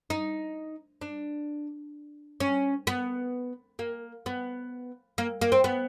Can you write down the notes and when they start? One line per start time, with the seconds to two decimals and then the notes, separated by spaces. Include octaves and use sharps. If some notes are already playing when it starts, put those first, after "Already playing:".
0.10 D#4
1.01 D4
2.40 C#4
2.87 B3
3.79 A#3
4.26 B3
5.18 A#3
5.42 A#3
5.52 C4
5.64 B3